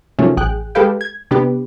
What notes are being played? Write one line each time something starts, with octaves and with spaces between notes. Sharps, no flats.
C3 D#3 F3 F#3 A3 C#4
A1 G#4 G5 F#6
G#3 G4 A4 B4 F5 G5
G#6
C3 B3 D4 G4 B4